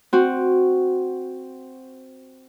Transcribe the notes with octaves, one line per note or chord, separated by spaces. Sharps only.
C4 F#4